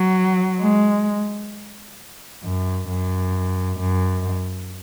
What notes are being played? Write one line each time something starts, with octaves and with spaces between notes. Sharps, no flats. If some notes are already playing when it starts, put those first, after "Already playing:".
Already playing: F#3
G#3
F#2
F#2
F#2